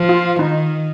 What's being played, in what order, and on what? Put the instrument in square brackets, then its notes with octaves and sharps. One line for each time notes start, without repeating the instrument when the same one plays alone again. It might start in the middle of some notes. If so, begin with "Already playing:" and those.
Already playing: [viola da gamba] F3
[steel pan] F4
[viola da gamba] D#3 [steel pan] D#4